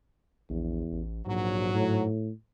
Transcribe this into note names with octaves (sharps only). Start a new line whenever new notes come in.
A#1 E2
A1
A#1 G#2 F#3
A2